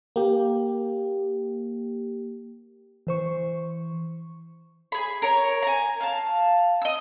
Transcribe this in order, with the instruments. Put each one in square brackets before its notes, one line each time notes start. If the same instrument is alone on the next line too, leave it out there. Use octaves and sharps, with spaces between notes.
[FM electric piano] A#3 G4
[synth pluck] E3 C5 C#6
[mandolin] G#4 B5
A#4 C#5
G#5 A#5
F5 A5
D#5 E6